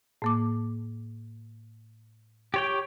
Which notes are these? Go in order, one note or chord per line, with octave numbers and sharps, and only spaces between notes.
A2 A#3 D6
G4 C#5 G5